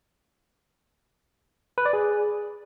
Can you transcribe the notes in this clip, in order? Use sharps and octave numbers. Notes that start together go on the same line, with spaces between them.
B4
D5
G#4